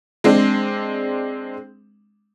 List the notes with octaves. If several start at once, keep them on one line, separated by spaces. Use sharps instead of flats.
G#3 C4 D4